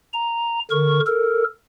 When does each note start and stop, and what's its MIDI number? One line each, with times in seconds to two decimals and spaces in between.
0.13 0.59 82
0.71 1.00 50
0.71 1.00 70
0.71 1.00 85
1.07 1.44 69
1.07 1.44 70